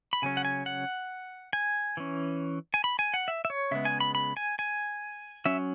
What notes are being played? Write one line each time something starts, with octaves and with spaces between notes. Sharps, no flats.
B5
C#3 F#3 C#4 G#5
F#5
G#5
F#5
G#5
E3 C#4
G#5
B5
G#5
F#5
E5
E5
C#5
C#3 G#3 B3 E5
G#5
B5
B5
G#5
G#5
F#3 C#4 E5